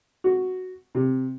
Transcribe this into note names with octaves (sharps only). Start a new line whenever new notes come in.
F#4
C3